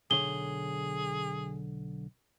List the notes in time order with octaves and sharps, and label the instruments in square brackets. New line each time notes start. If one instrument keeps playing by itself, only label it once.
[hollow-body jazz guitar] B1 D3 C#5 [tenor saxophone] G#4 [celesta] G7